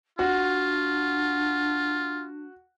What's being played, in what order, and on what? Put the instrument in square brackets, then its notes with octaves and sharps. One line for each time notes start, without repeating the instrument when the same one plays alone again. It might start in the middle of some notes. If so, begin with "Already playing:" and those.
[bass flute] D4 [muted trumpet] F4 [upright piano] F#4